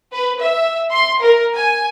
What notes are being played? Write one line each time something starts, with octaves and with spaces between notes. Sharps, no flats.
B4
E5
C6
A#4
G#5